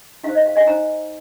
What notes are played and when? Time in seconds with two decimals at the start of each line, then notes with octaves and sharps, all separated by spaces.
0.24 D#4 F5
0.29 C5
0.35 D#5
0.46 F5
0.56 D#5 G#5
0.66 D#4 C5 F5 A#5